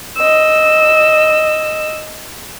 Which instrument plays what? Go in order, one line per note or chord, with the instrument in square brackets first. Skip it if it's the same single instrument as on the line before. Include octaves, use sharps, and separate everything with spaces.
[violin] D#5 E6